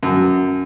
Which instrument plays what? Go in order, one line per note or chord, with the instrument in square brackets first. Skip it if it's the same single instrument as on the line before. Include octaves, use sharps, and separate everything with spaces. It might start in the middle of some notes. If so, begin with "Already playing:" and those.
[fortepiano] F#2